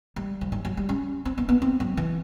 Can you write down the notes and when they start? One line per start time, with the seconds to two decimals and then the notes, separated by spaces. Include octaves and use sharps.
0.16 G3
0.41 F3
0.52 F#3
0.65 F#3
0.77 G3
0.89 C#4
1.25 C4
1.38 B3
1.49 B3
1.62 C4
1.80 F#3
1.97 E3